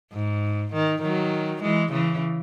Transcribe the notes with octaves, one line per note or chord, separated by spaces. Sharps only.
G#2
D#3
D#3 F#3
E3 G#3
C#3 E3